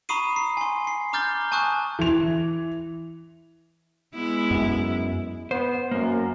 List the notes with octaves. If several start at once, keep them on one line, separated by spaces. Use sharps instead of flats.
A#5 B5 C#6 D#6 C7 D#7
C7
G#5 C6
C7
A#5 D6 F6 G6 A6 G7
G#5 A5 C#6 D#6 F#6
E3 F7
G#3 B3 E4
F#2
B3 C5
F#2 A#3